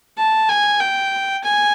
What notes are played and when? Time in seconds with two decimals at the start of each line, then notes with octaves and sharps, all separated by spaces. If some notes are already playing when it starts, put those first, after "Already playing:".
0.17 A5
0.49 G#5
0.80 G5
1.43 G#5